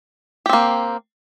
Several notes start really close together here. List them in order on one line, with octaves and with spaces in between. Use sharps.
G4 C4 A#3